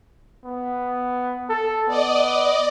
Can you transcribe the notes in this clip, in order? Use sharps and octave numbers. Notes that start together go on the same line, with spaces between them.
B3
A4
B3 D5 D#5